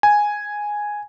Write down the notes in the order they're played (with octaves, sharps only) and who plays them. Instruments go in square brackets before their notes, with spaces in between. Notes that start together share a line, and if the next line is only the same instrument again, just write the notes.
[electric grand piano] G#5